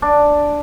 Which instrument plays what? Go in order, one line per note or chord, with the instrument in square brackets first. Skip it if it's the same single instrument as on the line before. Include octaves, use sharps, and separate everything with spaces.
[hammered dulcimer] D4